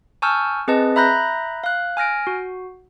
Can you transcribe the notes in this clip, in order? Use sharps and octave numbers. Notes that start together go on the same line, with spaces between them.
G#5 A5 C#6 E6 F6 G6
C4 G#4 B4 D#5 A5
E5 A#5 B5 F#6 G6 A#6
F5 F#6
G#5 F6 A#6 D7
F#4